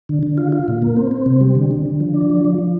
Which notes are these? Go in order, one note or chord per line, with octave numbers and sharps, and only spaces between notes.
D3
D3
F4
F4
A#2
A#3
C4
C4
C3
G3
D3
D3
D3
F3
D4
F3
F3
F3